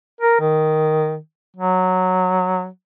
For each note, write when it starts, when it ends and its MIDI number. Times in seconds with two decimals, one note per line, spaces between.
0.21 0.37 70
0.41 1.17 51
1.57 2.67 54